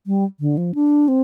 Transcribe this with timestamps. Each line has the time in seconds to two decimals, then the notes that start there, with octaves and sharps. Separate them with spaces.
0.07 G3
0.40 D3
0.57 F3
0.75 D4
1.08 C4